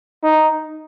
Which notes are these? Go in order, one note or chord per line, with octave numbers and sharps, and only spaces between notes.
D#4